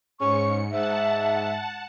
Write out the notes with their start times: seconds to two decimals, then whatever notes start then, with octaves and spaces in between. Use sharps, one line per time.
0.20 G#2 G#3 C#4 C#6 C#7
0.72 G#2 E5 F#5 A5